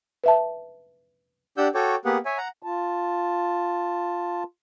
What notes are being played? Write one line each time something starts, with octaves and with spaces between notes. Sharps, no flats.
B4 E5 A5
D4 G4 D5 F#5 E6 G6
F#4 A4 C#5 G5 D6
A#3 B3 G4 G#4 B4 F#5
C#5 E5 G#5
F#5 A#5
F4 A5